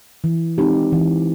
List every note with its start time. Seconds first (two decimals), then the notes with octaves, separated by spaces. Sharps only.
0.24 E3
0.58 G#3 C4 D#4 G4
0.92 E3